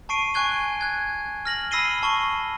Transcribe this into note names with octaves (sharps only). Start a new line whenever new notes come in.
A5 C#6 C7 D7 D#7
G#5 C#6 F#6 G#6 G7
F#6 G#6
F6 A#6 F#7
B5 E6 A#6 C7 D#7 G7
A5 C#6 G7